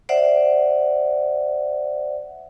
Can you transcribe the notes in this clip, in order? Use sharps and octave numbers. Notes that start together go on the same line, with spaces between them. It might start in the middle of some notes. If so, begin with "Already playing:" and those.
C5 D5 E5 F#5